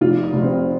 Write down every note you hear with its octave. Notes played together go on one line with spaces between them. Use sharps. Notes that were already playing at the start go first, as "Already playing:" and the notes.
F1 F4
D#4
F1
C4